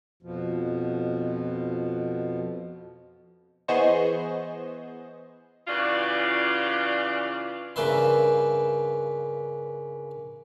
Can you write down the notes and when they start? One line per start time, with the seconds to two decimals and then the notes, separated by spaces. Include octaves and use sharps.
0.23 F2 B2 F3
3.68 E3 B3 G#4 C5 D#5 C#6
5.67 C#3 E3 D4 F4 F#4 D5
7.76 G2 C#3 A#3 B4 E5 C6